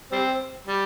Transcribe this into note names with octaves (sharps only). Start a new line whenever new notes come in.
G3 C4
G3